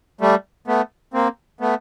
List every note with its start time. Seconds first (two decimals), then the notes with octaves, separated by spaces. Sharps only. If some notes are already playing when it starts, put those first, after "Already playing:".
0.21 G3 A3
0.67 A3 B3
1.14 A#3 C4
1.61 A3 B3